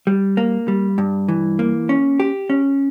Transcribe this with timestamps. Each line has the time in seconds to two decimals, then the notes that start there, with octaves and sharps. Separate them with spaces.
0.07 G3
0.37 A#3
0.68 G3
0.98 G2
1.29 E3
1.59 A#3
1.89 C#4
2.20 G4
2.50 C#4